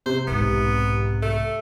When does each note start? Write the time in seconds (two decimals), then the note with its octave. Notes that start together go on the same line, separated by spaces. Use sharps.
0.06 C3 C5
0.27 B1 G#2 B3
1.22 A3